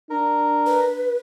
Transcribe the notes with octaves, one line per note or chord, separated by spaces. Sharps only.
D4 A#4
B4